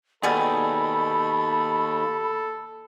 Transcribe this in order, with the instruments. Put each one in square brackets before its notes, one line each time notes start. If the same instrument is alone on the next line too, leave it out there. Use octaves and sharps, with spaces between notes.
[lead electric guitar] D#2 [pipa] B2 G3 G#4 [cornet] A4 [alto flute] B5